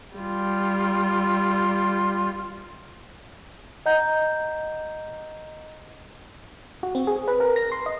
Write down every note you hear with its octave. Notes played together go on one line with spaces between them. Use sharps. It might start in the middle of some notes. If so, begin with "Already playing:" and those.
G3 F4
D#5 F#5 A#5 G6
F#4
C4
G#4
B4
A#4
A#6
C6
D#5